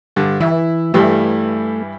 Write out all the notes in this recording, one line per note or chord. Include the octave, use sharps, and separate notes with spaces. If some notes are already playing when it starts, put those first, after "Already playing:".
G2 D3
E3 E4
G2 E3 G3 A3